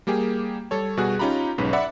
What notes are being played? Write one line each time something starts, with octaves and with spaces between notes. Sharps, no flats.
G3 A#3 G4 G#4
G3 A4 C#5
B2 G3 F#4 G#4 F#6
C#4 D#4 F4 G4 A#5 B5
B1 G#2 C#4 B4 B6
D5 E5 F#5 B5